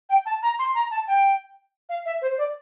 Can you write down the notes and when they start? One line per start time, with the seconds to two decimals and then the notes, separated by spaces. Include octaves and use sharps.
0.09 G5
0.26 A5
0.43 A#5
0.59 C6
0.75 A#5
0.91 A5
1.08 G5
1.89 F5
2.06 E5
2.22 C5
2.38 D5